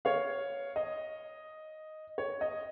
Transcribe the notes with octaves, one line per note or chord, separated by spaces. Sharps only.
C#5 F5
D#5
C#5
D#5